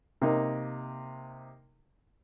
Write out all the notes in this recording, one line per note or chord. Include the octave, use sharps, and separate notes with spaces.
C3 A#3 D#4